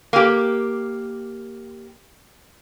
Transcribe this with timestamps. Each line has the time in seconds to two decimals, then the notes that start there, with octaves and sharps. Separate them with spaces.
0.13 A#3 G4